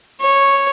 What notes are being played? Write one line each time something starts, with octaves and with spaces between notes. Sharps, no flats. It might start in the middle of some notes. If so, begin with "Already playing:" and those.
C#5